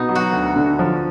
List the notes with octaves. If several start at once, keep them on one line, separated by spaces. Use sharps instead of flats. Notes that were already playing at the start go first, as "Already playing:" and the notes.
Already playing: B2 B3 D#4
F#3
F#4
D2
D3
F3